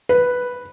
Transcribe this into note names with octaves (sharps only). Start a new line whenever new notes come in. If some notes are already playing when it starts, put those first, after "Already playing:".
B4